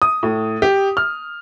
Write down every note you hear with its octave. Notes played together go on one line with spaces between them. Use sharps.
D#6
A2
G4
F6